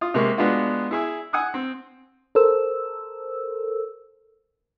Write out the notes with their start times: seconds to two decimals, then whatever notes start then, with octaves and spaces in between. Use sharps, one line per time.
0.01 F4 D#6
0.14 C3 G#3 A#3 C#6
0.37 G#3 B3 D4 F4 F#4
0.91 E4 G#4 E5
1.33 F#5 G#5 D#6 E6 F#6
1.54 C4
2.35 A4 A#4 C5 E6